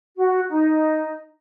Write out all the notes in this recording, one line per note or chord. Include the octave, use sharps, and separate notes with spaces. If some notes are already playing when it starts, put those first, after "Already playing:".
F#4
D#4